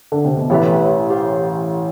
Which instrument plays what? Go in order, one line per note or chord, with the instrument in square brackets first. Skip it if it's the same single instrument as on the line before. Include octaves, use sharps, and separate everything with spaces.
[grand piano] D3
C3
B2
[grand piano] A1 A2 [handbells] E4 G4 B4 E5
[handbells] G4 C5 F5